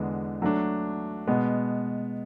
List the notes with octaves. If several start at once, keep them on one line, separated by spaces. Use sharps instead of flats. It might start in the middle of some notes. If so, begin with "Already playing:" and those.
Already playing: E2 D3 G#3 B3
F#3 A3 D4
B2 G#3 B3